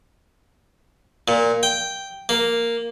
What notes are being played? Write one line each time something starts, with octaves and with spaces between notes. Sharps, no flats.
A#2
G5
A#3